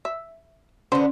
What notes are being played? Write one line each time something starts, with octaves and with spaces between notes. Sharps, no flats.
E5
D3 B3 C#4 C5